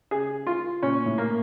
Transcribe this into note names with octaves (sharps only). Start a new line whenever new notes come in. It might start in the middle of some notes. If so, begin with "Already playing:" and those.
C#3 G#4
F4
A#2 C#4
A2
A#3